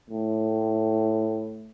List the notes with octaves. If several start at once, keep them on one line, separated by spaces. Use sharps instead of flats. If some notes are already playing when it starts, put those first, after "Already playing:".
A2